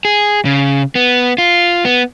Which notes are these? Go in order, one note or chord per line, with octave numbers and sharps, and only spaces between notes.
G#4
C#3
B3
F4
B3